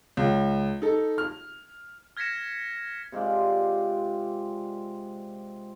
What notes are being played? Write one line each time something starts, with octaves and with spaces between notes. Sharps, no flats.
C#2
D#4 A4
F6
F6 G#6 A#6 B6 C#7 E7
C3 G#3 F4 D5